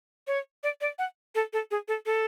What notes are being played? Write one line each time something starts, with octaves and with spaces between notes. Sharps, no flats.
C#5
D5
D5
F#5
A4
A4
G#4
A4
A4